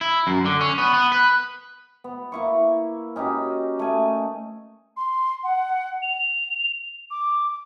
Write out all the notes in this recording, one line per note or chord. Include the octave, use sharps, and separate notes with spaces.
E4
F#2
D3
C#4
B3
B3
B4
B3
A#3 E4 C#6
C#4 D#4 F#4 G4
A3 G#5
C6
F#5
F7
D6